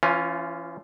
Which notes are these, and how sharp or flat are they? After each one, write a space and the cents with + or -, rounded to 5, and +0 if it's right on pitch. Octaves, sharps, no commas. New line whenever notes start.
E3 +40 C#4 +0 F4 +0